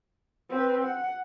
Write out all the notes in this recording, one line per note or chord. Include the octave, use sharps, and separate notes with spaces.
C4 B4
F#5